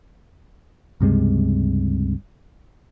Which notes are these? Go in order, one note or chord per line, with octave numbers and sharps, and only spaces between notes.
C#2 G2 C3 G#3